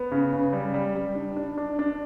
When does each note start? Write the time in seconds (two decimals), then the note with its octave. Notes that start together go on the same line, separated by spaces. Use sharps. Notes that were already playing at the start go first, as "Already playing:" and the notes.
Already playing: B3
0.11 C#3
0.33 C#3
0.53 G3
0.74 G3
0.95 G3
1.15 D4
1.36 D4
1.58 D4
1.79 D4